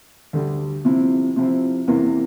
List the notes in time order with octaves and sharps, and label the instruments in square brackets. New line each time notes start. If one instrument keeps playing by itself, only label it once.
[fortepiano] D2 D3 G3
C3 F3 C4 E4
C3 F3 C4 E4
E2 C3 E3 A#3 E4